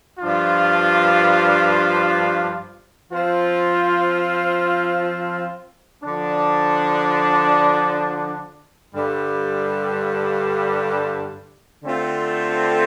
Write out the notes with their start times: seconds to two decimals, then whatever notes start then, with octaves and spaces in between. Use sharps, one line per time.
0.20 G2 F3 D4 F4
3.11 F3 C4 F4
6.02 D3 F3 D4
8.93 G2 D3 G3
11.84 D3 A3 C4 F4